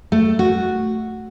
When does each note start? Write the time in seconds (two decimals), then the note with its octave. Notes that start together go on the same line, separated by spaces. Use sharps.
0.12 A3
0.39 F#4